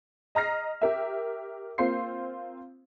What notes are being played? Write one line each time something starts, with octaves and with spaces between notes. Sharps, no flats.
D#5 A#5 F6 A#6 C7
G4 A#4 E5
A#3 C4 F4 C5 C6 C7